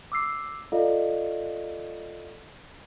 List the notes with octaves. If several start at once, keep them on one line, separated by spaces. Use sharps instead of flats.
D6 E6 C7
F4 A4 D5 D#5 F5